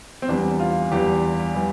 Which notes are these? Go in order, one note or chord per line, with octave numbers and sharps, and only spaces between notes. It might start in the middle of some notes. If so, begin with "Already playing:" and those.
C4
E2 E3 G3 D4
F4
E2 E3 G3 G4
E3 G3